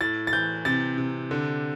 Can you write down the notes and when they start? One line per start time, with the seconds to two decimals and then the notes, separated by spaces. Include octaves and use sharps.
0.01 A2 A6
0.27 A6
0.33 E3 G6
0.65 C3 A6
0.98 C3
1.31 D3